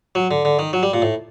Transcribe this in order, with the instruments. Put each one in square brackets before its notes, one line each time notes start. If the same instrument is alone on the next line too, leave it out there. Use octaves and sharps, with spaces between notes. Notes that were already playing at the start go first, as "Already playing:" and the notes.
[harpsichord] F#3
D3
D3
D#3
F#3
G3
A#2
A2